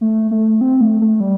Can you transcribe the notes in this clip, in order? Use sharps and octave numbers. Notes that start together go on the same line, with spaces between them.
A3
A3
C4
A3
A3
G3